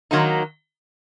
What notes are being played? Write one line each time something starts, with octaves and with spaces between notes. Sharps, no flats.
D#3 F#3 A#3 D#4